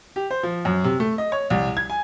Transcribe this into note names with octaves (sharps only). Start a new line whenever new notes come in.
G4
C5
F3
F#2
C3
A3
D#5
C#5
C2
G#6
G#5